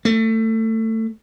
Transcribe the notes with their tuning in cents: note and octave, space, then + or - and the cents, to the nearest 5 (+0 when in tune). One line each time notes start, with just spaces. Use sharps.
A3 +25